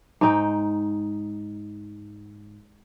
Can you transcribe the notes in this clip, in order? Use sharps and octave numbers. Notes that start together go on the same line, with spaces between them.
G#2 D#4 G5